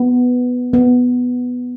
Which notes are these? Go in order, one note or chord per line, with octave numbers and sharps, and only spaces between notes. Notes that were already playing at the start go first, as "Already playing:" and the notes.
Already playing: B3
B3